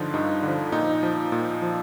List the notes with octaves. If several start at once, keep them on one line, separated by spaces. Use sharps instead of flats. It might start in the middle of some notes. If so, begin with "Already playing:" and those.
Already playing: G2 D3 F3 D#4 F4
G2 D#4
D3 F3
A#2 D#4
F3
A#2
F3